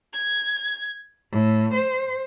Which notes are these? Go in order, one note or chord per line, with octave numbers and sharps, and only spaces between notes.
G#6
A2
C5